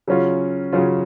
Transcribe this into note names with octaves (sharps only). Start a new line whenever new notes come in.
C#3 F#3 C#4 F4
C#3 F#3 C#4 F4